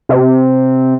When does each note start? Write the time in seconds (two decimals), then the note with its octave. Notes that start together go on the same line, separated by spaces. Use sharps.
0.09 C3